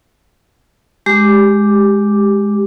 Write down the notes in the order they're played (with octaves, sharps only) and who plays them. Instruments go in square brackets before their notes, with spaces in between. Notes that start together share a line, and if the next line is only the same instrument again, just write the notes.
[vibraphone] G#3 G4 D6